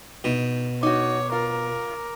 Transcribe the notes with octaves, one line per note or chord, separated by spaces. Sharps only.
B2 D#4
D#4 F#4 C#5 D6
F4 A#4